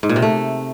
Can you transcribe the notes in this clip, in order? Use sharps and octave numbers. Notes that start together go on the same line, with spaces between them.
G#2
A#2
C3
A3